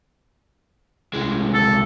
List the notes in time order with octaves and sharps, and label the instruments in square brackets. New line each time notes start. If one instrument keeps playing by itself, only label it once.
[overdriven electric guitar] C2 G#3
[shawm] A4